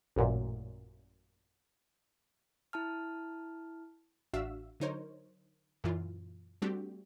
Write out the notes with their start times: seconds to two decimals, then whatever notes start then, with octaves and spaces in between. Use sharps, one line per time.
0.16 A1 F#2 A#2
2.73 E4 A5 F6
4.33 A1 D4 F#4 E5 F5 E6
4.80 D3 F#3 D#4 A#4 C5 C#5
5.84 F#2 A#2 E3 E4 F4
6.62 G3 A3 C4 D4 F#4 G4